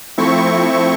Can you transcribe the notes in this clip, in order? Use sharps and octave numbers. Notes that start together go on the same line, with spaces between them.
F3 A3 C4 E4 C#6